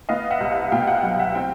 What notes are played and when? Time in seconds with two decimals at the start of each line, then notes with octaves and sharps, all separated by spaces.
0.09 B3 D#5 F5
0.31 E5 F#5
0.41 C2
0.51 D#5 F5
0.72 B2 F5 G5
0.87 E5 F#5
1.03 F#3
1.19 E5 F#5
1.35 C4 F5 G5